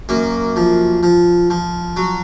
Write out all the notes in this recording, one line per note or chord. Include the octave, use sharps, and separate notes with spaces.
F#2 A#3
F3
F3
F3
F#3